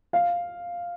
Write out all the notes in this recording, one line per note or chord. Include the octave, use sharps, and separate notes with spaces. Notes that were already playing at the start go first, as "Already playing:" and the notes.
F5